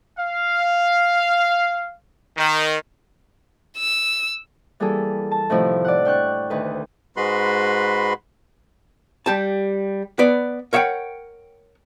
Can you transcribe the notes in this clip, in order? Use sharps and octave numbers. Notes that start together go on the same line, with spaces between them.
F5
D#3
E6
E3 G3 A#3 E4 G#4 A4
A5
A2 C3 D#3 F3 C4 E4
D5 F#5
D4 G5 C#6 F#6
D2 D#3 B4
G#2 G#3 F#4 B4 B5 C6
G3 G4 A5
B3 B4 D5
A#4 C#5 E5 F#5 G5